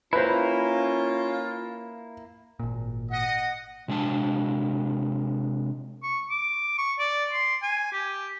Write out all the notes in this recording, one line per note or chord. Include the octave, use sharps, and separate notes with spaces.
A#3 C#4 E4 F4 B4 C5
G#1 A#2
D#5 F#5
C3 G#3 D4 A5
C#6
D6
C#6
D5
C6
G#5
G4